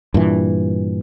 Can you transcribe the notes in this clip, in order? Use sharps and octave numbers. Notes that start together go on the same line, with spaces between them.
G2 A#2 E3